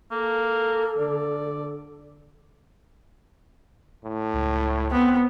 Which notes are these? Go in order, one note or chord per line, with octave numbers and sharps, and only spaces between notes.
A#3 A4
D3 D5
A2
C#2
B3 C4